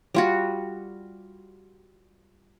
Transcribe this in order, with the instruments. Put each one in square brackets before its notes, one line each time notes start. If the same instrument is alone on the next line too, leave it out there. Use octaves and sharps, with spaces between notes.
[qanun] G3 F4 F#4